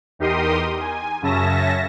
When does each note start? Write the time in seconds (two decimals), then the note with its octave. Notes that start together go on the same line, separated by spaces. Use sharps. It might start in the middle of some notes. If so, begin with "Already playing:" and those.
0.19 E2 D#4 G4 A#4 C6 D#6
0.81 G#5
1.22 F#2 C#3 C#4 E5 A5 A#6